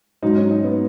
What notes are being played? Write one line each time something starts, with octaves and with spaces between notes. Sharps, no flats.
G#2 F#3 D#4
C#4
D#4
B3